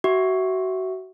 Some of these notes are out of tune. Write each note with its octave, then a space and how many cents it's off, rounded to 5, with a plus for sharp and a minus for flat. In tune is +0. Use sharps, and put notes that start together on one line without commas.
F#4 +25 E5 +0 C#6 +5